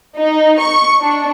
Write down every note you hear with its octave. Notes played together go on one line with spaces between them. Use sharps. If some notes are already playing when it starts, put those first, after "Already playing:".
D#4
C#6
D4